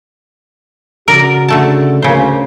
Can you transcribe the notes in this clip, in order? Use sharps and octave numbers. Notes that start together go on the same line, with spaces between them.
C#3 F#4 A#4 D5
D3 A3 A5
D2 C#3 A#3 C5